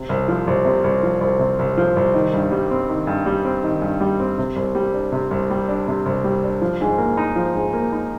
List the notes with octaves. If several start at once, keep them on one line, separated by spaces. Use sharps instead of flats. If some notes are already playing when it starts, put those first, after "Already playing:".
Already playing: C3
C2
F3
C2
C3
C2
F3
C2
C3
C2
F3
C2
D#3
G2
G3
C4
D#3
G2
G3
C4
D#3
G2
G3
C4
C3
C2
G3
D4
C3
C2
G3
D4
C3
C2
G3
D4
F3
G#2
A#3
D#4
F3
G#2
A#3
D#4